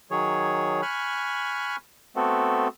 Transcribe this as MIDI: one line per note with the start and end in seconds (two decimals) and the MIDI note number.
0.11 0.81 51
0.11 0.81 54
0.11 0.81 68
0.11 0.81 73
0.82 1.76 80
0.82 1.76 83
0.82 1.76 85
0.82 1.76 89
0.82 1.76 90
2.16 2.68 57
2.16 2.68 59
2.16 2.68 60
2.16 2.68 66
2.16 2.68 69